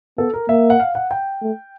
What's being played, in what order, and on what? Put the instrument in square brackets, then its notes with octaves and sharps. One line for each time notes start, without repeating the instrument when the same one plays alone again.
[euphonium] B3 [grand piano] A4
[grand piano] A#4
[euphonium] A#3 [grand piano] E5
[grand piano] F#5
F5
F#5
G5
[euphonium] A3